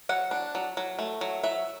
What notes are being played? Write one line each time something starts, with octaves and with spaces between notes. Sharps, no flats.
F#3 F#5
D4
F#3
F#3
A3
F#3
F#3 E5